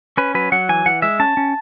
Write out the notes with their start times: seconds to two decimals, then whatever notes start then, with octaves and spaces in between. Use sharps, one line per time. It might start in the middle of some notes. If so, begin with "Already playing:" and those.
0.17 C#4 B4
0.35 F#3 B4
0.52 F#3 F#5
0.69 E3 G#5
0.86 E3 F#5
1.02 G#3 E5
1.20 C#4 A5
1.37 C#4